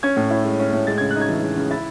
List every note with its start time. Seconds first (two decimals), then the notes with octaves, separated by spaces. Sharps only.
0.03 C#4 G#6
0.17 A2
0.30 E4
0.44 G#3
0.60 C#4
0.73 A2
0.87 G#3 A6
0.98 C#3 G#6
1.10 F#6
1.16 D#4
1.21 G#6
1.29 E3
1.43 G#3
1.57 C#3
1.70 E4 A6